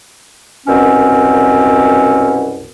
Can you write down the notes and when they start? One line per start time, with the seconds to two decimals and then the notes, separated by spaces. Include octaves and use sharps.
0.66 C2 F#2 B2 C4 C#4